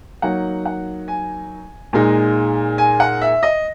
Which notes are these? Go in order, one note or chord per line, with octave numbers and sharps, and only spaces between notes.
F#3 A#3 D#4 F#5
F#5
G#5
A#2 G#3 D#4
G#5
F#5
E5
D#5